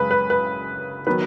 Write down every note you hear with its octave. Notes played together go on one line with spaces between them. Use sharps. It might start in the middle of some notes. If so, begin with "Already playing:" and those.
Already playing: F#2 C#3 G#3 B4
B4
B4
D#3 F#3 B3 B4